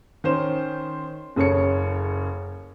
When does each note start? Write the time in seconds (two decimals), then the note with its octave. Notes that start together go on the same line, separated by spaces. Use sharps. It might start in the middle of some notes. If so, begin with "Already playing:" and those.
0.24 D#3 C#4 C5 E7
1.36 F#1 C#3 A4 C#5 C#7